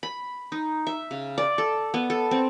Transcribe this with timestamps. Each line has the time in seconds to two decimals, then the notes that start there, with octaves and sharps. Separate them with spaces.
0.03 B5
0.52 D#4
0.87 E5
1.11 C#3
1.38 D5
1.58 A4
1.94 B3
2.10 A4
2.31 C4